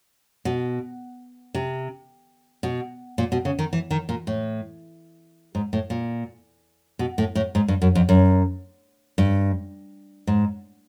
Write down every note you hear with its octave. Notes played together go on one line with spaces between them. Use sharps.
B2
C3
B2
A#2
B2
C#3
D#3
E3
D#3
A#2
A2
G#2
A2
A#2
B2
A2
A2
G#2
G2
F#2
F2
F#2
G2
G#2